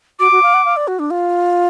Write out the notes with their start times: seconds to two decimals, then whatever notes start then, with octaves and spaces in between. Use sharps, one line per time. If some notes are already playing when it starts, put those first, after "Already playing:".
0.20 F#4 D6
0.32 F#4
0.43 F5
0.54 F#5
0.65 F5
0.77 D5
0.88 F#4
0.99 D4
1.11 F4